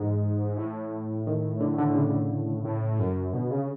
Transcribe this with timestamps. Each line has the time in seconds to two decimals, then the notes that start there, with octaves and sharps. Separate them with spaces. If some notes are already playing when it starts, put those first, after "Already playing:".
Already playing: G#2 E3
0.57 A2
1.27 D#3
1.61 D3
1.78 D3
1.95 C#3
2.64 A2
2.99 F#2
3.33 B2 D3
3.51 C#3